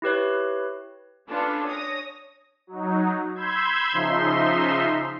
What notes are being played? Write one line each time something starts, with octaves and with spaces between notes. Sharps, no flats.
E4 G4 B4 C#5
C#4 D4 F4 A4 B4
C#5 D#6 A#6
F#3 D#4
B5 C6 E6 G6 G#6
C#3 F3 D#4 E5 C6